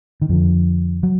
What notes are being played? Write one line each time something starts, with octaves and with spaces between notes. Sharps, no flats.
D#3
F2 D3 F3
F#3